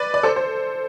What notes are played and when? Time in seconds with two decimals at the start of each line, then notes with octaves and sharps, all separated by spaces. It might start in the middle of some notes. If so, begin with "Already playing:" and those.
Already playing: B4 D5
0.14 D5
0.23 A4 C5
0.36 C5